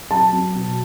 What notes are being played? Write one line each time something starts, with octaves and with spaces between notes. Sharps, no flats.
F#3 A5
F#3
B2